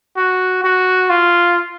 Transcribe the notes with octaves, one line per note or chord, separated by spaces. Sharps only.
F#4
F#4
F4